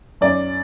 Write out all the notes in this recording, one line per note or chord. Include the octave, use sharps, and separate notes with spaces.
F#2 D5